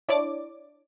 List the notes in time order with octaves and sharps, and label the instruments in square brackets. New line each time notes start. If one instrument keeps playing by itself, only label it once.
[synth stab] D4 E4 C#5 D5 D6